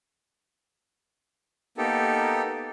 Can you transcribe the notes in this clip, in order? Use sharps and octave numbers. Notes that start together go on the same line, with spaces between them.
A#3 B3 D#4 G4 A4